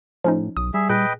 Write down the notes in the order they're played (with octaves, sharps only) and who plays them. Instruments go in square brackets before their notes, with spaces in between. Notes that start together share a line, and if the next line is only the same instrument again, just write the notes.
[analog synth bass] A2 [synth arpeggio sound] F3 C#4 D#4
[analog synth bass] B1 [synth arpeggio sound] D#6
[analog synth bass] G3 [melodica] G#4 E5
[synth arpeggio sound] A#2 G#4 F#6 [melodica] B4 D#5 G5